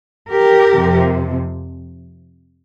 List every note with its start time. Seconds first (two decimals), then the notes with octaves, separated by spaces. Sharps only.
0.30 G4 A#4
0.73 F2 C3 F3